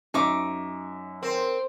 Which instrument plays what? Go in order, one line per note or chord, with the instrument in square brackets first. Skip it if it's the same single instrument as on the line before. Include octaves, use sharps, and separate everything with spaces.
[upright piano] F#2 E5 [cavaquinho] D#4 C#6 D6
[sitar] C4 [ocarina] A#4